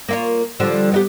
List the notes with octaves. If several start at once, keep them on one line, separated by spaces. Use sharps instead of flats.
A#3 F4 C#5
D3 F3 G3
B3 D#4 G4